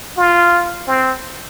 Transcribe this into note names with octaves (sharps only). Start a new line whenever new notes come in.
F4
C4